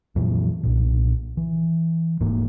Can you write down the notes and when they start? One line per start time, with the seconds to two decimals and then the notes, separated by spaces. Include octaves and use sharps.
0.16 F2 A#2 E3 F#3
0.63 B1 A#2
1.37 E3
2.20 D#1 G#2 A#3